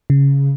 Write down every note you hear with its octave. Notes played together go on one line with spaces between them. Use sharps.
C#3